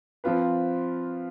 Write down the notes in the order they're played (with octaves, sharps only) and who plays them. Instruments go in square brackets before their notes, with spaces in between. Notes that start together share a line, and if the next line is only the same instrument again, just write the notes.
[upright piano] F3 C4 F4 B4